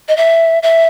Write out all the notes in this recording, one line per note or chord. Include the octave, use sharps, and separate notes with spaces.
D#5
E5
E5